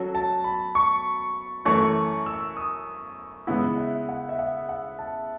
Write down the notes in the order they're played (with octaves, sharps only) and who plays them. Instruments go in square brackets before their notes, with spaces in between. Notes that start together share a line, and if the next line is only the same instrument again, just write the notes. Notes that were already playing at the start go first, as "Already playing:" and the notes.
Already playing: [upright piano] F#3 C#4 F#4 A4
[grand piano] A5
B5
C#6
[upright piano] F#2 E3 A3 C#4 [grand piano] C#6
[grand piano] E6
D#6
[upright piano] C#3 G#3 B3 E4 [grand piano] F#5
[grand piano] E5
F#5
E5
F#5
F#5
A5